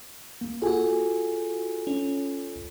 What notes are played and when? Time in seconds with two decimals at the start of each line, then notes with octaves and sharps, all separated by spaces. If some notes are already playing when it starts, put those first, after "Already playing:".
0.41 A#3
0.62 F4 F#4 G#4 A4 G#5
1.87 C#4